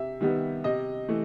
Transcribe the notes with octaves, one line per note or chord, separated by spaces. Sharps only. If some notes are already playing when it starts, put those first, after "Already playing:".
Already playing: C3 E5
D#3 G3 B3
C3 D#5
E3 A3